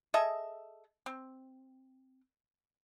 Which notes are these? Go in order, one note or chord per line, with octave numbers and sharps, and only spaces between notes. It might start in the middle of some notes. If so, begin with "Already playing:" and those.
G#4 A4 D#5 E5
C4